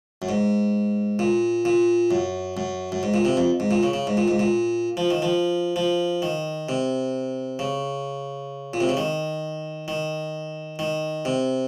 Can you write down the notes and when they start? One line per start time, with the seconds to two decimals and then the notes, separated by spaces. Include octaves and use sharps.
0.22 F#2
0.29 G#2
1.19 A#2
1.65 A#2
2.11 F#2
2.57 F#2
2.92 F#2
3.03 G#2
3.14 A#2
3.25 C3
3.37 F2
3.60 G#2
3.71 A#2
3.83 C#3
3.93 C#3
4.07 G#2
4.17 A#2
4.28 G#2
4.39 A#2
4.97 F3
5.10 D#3
5.22 F3
5.76 F3
6.22 D#3
6.69 C3
7.59 C#3
8.74 A#2
8.81 C3
8.89 C#3
8.97 D#3
9.88 D#3
10.79 D#3
11.25 C3